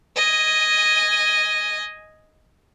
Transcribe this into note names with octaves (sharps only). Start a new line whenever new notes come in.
D#5 G#5